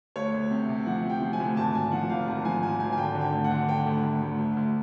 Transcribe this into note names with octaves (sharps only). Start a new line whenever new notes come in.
D2 C#5
D2
C3
C3
F3 F#5
C3
G5
F3
G#5
D2
G#1 A5
G#1 G#5
F3 F#5
G#1 F5
G#1 F#5
F3 G#5
G#1 G#5
G#1 G#5
G#5
D3 G5
D3
G5
D2
F#5
D3
D3 G5
D2
D2
D2
D2
D2